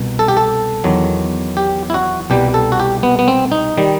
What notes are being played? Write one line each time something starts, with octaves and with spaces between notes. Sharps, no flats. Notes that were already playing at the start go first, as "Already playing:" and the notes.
Already playing: C2 B2
A4
G4
A4
E2 D#3 F#3
G4
E4
F#4
C2 B2 G3 G4
A4
F#4
G4
B3
B3
C4
D#4
D#3 G3